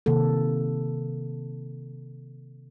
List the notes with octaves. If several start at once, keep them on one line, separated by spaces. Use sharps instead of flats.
C3 D#3 A#3 A4